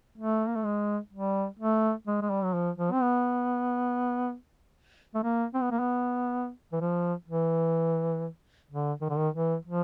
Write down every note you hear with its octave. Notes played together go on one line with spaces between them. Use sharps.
A3
A#3
A3
G#3
G3
A3
G#3
G#3
G3
F#3
F3
F3
C4
B3
A3
A#3
C4
B3
A#3
B3
E3
F3
E3
D3
D#3
D3
D#3
E3
F3